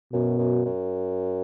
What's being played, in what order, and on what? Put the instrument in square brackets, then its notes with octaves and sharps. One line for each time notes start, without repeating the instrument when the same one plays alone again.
[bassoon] F#2 [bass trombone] B2
[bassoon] F#2
F#2